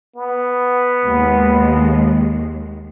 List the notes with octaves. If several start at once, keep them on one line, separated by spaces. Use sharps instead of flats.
B3
D#2 G#3